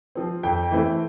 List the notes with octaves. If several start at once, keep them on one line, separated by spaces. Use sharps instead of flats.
F3 C4
F2 G5
E3 A3 C4